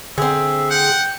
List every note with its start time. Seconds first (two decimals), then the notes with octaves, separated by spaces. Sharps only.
0.18 D3 C4 G#4 E5
0.70 F#5 G5